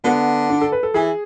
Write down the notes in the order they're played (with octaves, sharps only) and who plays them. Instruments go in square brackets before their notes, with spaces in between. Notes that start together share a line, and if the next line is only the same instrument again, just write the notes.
[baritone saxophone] D3 [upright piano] B3
[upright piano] D4
A4
B4
A4
[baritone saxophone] E3 [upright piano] G#4